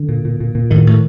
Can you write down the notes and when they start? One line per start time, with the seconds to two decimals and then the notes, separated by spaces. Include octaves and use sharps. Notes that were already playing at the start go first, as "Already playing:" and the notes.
Already playing: D3
0.09 A#2
0.25 A#2
0.40 A#2
0.55 A#2
0.71 A2 D#3
0.87 A2